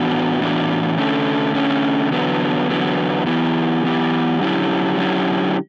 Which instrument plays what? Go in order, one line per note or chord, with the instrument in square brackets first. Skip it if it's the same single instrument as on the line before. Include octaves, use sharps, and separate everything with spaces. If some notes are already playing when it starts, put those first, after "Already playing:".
Already playing: [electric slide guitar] A2 E3 B3 D4 F#4
A2 E3 B3 D4 F#4
D3 A3 C#4
D3 A3 C#4
E2 D3 F#3 B3
E2 D3 F#3 B3
E3 B3 E4 G4
E3 B3 E4 G4
D3 F#3 C#4 E4 G4
D3 F#3 C#4 E4 G4